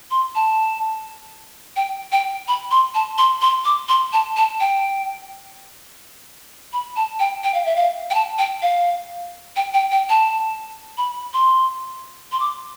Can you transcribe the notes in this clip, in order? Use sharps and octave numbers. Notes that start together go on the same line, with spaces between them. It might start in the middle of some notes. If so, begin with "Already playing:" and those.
C6
A5
G5
G5
B5
C6
A5
C6
C6
D6
C6
A5
A5
G5
B5
A5
G5
G5
F5
E5
F5
G5
A5
G5
F5
G5
G5
G5
A5
B5
C6
C6
D6